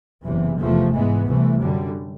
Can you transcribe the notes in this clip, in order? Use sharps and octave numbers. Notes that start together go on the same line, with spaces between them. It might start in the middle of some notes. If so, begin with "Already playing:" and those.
F#1 E2 C3 E3
F1 E2 C3 F3 A3
G#2 E3 G#3 B3
C2 C3 E3 A3
F#2 D3 G3